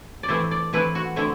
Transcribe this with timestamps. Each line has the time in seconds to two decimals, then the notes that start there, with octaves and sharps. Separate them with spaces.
0.23 D5
0.28 E3 A3 C4 E4 C5
0.51 D5
0.73 E3 A3 C4 E4 B4
0.95 F#4
1.16 D3 A3 C4 E4